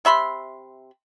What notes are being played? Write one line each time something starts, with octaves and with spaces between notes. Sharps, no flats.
C3 E5 B5 C6